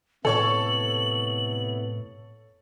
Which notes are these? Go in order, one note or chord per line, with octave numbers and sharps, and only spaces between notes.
A2 C3 B3 E4 A4 C#5 C#6 F#7